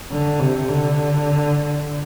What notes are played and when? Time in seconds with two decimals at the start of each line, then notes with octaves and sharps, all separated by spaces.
0.11 D3
0.40 C3
0.69 D3